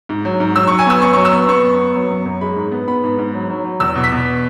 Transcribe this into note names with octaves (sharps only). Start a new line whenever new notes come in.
G#2
F#3
G#2
F#3 E6
F#3 C#6
G#5
B3 E6
F#2 C#6
F#3 C#6
E6
B3
B3 C#6
F#2
B3
F#3
F#2
F#2
G#3 B5
G#2
B3
B3 B5
G#2
G#2
F#3
F#3
F#3
E2 E6
B2
B6
B2